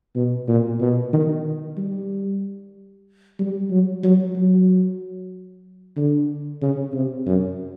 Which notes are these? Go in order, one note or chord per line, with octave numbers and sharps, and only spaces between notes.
B2
A#2
B2
D#3
G3
G3
F#3
F#3
F#3
D3
C#3
C3
F#2